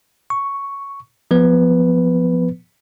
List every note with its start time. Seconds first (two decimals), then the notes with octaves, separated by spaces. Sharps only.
0.30 C#6
1.31 F3 B3 B4